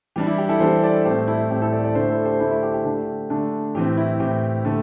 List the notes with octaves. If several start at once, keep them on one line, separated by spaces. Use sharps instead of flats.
E3 G3 D4 G4
E4
G4
E4 A4
E3 G3 D4 G4 C5
A4 D5
A2 A3 C4 G4 C5
E4 A4
A2 A3 C4 G4
E4 A4
A4 D5
A4 D5
D3 A3 D4 C5 E5
E4 A4
G4 C5
D3 A3 D4 E4 A4
E4
G4
G4
D3 A3 D4
D3 A3 D4
A2 E3 C4 G4
E4
A2 E3 C4 G4
D3 A3